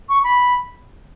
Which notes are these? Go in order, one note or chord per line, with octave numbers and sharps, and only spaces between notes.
C#6
B5